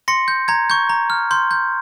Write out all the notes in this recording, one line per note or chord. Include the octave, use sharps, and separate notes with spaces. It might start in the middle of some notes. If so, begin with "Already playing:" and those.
C6 A#6 C#7
G6
A#5 G#6
C#6 G6
A#5
F6
C6 G6
G6